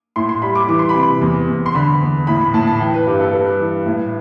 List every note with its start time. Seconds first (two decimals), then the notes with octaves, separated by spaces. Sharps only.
0.16 A2 C6
0.29 C6
0.42 G3 B5
0.55 D6
0.68 E3 D6
0.79 C6
0.89 B5
0.95 C3 C6
1.21 E2
1.48 E2
1.66 C6
1.74 D3 B5
2.01 E2
2.27 A2 B5
2.54 A2 A5
2.67 A5
2.80 E3 G5
2.94 B4
3.07 G2 G4
3.20 A4
3.33 G3 B4
3.60 E3
3.86 A2